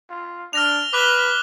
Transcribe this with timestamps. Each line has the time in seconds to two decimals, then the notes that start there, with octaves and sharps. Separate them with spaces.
0.10 F4
0.53 D4 F6 A#6 F7
0.93 B4 D6 F#6 G7